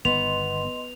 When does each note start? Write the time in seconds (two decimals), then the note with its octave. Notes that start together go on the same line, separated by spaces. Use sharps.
0.05 G1 D#3 B3 D#5 C6 F7